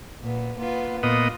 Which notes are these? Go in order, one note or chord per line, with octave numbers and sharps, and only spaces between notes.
A#2 B3
A#3 B3 F4
A#2 B3 F4 D#5